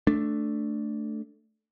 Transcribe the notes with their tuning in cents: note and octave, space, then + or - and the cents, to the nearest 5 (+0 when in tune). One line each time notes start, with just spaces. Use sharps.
A3 +0 D4 +0